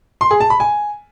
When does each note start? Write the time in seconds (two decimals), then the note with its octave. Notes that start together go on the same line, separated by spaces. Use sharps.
0.21 C6
0.31 G#4
0.40 A5
0.50 B5
0.60 G#5